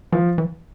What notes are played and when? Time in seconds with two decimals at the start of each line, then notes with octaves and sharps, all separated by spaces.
0.12 E3 F3
0.38 E3